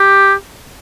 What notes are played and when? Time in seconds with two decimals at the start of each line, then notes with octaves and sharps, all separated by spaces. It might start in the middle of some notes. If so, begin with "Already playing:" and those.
Already playing: G4